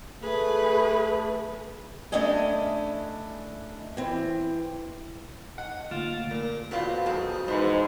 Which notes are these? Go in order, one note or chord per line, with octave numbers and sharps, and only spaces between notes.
A3 G#4 B4
A3 C#4 D4 E4 D#5 G#5
E3 C4
D#5 F#5
D3 A3 A#3 F4
A#2 A#4
A1 A#2 B3 C4 F4 F#4
F2 F#3 G#3 C4
E2 G#2 D#4 B4 C5